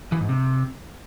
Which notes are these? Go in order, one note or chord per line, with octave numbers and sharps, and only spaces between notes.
E3
G#2
C3